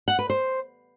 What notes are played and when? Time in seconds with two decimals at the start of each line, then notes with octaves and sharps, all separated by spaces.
0.08 F#5
0.19 B4
0.30 C5